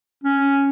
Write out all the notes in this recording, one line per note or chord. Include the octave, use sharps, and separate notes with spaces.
C#4